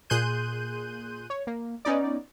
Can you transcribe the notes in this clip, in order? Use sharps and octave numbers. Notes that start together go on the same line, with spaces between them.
A#2 G#4 C6 F#6 G6 D#7
C#5
A#3
B3 C#4 D#4 D5